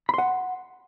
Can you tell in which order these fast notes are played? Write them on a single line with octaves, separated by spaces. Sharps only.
B5 C6 F#5